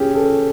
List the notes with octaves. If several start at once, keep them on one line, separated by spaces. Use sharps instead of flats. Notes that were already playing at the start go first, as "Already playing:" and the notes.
Already playing: C#4 G4 G#4
A4